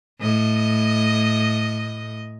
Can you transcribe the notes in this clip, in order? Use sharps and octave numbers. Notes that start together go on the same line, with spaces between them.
A2 D#5